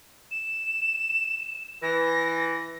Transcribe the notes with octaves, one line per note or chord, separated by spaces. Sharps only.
E7
E3 A#6